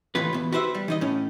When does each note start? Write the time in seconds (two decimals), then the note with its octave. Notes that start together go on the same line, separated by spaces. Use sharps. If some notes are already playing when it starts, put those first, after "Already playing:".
0.15 D#2 A2 E3 F4 B4
0.33 E2 B2
0.52 F#4 G4 B4 C5 D#5 E5
0.75 G3
0.88 E3 D#4 D#5
1.01 A2 C#4